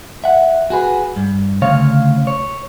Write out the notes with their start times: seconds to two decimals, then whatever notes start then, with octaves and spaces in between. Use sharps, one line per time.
0.24 E5 F#5
0.70 F#4 G#4 B4
1.16 G2
1.62 D2 C#3 C#5 F5
2.27 C#5